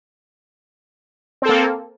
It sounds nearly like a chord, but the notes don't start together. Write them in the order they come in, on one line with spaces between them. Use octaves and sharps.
C4 A4 A#3